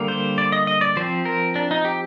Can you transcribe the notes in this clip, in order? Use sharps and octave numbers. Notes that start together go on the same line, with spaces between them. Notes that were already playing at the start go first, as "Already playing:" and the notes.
Already playing: D3 G3 A#3
C5
D5
D#5
D#5
D5
F3 C4 C5
A#4
D4
D#4
G4